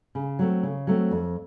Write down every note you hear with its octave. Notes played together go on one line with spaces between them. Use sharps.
C#3
F#3 A3 C4
C#3
F#3 A3 C4
F2